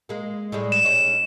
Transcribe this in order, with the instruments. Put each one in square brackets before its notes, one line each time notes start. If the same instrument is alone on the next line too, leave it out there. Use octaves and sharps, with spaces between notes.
[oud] G#3 A#3
A2 G3 G#3
[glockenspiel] E7
[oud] C#4 D#4 C5